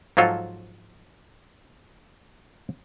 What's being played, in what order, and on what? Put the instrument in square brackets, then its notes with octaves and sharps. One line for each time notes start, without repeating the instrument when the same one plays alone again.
[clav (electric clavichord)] G#2 F3 F#3 F4 A4